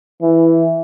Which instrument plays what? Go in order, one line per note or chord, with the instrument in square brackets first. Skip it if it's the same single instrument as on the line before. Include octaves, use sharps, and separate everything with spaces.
[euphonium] E3